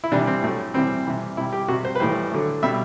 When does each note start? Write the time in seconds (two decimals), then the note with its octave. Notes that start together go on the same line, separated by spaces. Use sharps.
0.04 E4
0.12 C3 E3 G3 D4
0.27 C4
0.43 A2 F#3 A3
0.74 C3 E3 G3 C4
1.06 C3 E3 G3
1.37 C3 G3 E4
1.53 G4
1.68 C3 G3 F#4
1.85 C5
1.95 B4
2.00 A2 E3 G3 C5
2.31 D3 F#3 A3
2.63 B2 G3 E5